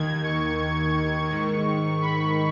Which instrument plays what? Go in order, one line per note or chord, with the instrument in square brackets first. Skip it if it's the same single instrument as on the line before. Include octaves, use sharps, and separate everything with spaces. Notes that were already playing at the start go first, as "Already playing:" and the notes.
Already playing: [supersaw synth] D#2 D#3 G#6
C#6
G#2 D#3
B5